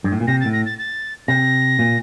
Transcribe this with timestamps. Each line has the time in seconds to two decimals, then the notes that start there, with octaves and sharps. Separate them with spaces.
0.04 G2
0.12 A2
0.20 A#2
0.27 C3 A#6
0.41 A6
0.45 A2
0.53 A#6
0.66 A6
0.79 A6
1.28 C3 A#6
1.79 A#2